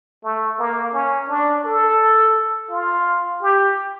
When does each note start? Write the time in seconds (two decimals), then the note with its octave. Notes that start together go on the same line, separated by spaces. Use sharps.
0.24 A3
0.59 A#3
0.93 C#4
1.29 D4
1.65 A4
2.71 F4
3.42 G4